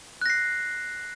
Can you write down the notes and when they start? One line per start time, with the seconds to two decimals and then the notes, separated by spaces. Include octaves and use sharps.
0.22 F#6
0.26 A#6
0.30 C7